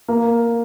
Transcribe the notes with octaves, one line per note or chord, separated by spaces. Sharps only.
A#3